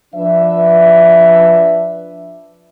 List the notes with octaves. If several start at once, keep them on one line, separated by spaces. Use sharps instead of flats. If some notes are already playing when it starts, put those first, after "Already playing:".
F3 D4 B4 E5